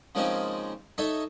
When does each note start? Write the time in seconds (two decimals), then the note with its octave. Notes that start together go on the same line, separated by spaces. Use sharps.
0.15 C#3 F3 G#3 A#3 C4 D#4
0.98 D#4 A4 C#5 D#5 E5